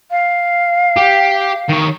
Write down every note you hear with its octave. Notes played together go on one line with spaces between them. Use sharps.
F5
G4
D#3 C#5